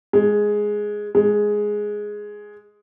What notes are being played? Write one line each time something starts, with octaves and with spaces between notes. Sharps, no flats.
G#3
G#3